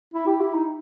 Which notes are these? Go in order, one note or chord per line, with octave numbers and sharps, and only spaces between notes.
E4
G4
E4
D#4